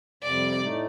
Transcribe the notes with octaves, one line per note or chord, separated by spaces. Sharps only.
F2 C3 G3 D5
A2 A3 D#4